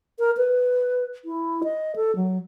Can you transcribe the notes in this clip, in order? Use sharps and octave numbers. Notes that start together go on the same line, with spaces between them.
A#4
B4
E4
D#5
A4
F#3